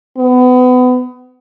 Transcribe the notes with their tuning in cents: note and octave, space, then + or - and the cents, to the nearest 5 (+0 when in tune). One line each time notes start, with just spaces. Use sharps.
B3 +30